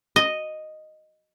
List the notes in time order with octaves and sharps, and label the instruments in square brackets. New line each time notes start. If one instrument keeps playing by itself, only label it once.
[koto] D#5